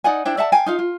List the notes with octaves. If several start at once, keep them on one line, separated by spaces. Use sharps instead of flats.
D#4 D5 F#5 G#5
D4 E4 C5 G5
D5 E5 F#5 A5
F5 G5 G#5
D#4 F4 F5
F4